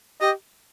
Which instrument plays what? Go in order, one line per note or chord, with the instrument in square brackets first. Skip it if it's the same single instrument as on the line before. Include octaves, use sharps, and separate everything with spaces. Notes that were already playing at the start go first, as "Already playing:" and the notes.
[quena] G4 [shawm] D#5